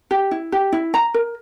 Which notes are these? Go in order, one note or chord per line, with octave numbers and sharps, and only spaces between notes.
G4
E4
G4
E4
A#5
A#4